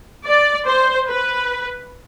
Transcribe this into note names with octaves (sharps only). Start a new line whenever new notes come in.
D5
C5
B4